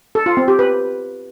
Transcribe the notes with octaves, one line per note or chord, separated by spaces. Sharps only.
A4
F4
C4
G4
B4